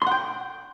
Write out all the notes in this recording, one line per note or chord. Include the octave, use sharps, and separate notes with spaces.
F#5 G5 C6